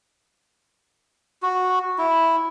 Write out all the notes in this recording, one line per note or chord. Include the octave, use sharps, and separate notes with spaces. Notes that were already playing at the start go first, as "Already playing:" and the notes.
F#4
E4